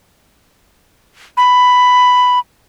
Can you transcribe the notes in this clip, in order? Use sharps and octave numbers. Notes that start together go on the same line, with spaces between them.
B5